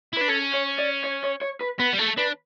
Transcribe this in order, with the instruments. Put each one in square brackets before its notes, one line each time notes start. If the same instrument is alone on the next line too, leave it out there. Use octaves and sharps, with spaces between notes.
[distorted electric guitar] E4
[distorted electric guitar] D4 [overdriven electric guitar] B4
[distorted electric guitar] C#4 [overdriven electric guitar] A4
[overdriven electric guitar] C#5
D5
C#5
C#5
C#5
B4
[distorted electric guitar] B3 [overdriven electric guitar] B4
[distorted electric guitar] G3
[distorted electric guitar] A3 [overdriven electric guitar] A4
[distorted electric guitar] D4 [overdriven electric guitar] B4